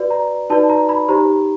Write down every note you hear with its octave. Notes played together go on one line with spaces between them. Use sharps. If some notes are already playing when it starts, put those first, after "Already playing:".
Already playing: F#4 B4 D5
A#5
D#4 F#4 B4 D5 A5
A#5
B5
D#4 G4 C5 A#5